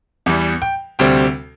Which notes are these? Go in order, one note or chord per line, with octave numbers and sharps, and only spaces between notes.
E2 E3 G3
G5
D2 C3 G3 C4 G5